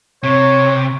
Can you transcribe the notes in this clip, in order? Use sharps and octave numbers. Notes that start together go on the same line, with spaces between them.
C3 C#5